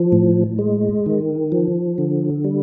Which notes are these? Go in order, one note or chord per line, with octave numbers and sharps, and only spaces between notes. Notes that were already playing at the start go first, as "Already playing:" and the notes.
Already playing: F3
A2
G#3
D#3
F3
D3
G3